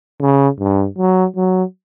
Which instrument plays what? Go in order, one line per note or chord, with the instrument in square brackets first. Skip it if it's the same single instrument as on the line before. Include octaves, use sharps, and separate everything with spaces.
[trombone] C#3
G2
F#3
F#3